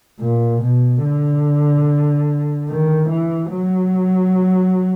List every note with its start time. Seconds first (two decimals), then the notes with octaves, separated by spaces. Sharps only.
0.21 A#2
0.62 B2
1.03 D3
2.69 D#3
3.09 E3
3.51 F#3